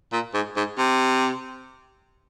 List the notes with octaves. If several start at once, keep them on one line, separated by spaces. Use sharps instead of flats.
A#2
G#2
G#2
C3